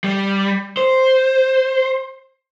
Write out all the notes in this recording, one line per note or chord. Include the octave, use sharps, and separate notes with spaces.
G3
C5